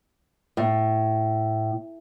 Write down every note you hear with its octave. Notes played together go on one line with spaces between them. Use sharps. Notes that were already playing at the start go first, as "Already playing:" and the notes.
A2